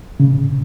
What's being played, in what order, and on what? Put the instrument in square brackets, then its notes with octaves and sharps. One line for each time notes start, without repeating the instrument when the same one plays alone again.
[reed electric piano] C#3